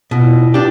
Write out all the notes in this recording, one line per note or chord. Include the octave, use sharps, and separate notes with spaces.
B2 F4
E4
D#4
E4
D4 F4 G4